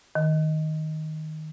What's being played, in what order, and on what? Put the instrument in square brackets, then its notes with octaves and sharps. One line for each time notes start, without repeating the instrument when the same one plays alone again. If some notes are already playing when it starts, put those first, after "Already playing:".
[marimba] D#3